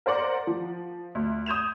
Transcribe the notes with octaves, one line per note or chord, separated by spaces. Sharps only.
A#4 C5 D5 F#5 D6
F3
D2
D#6 G6 G#6 E7 F7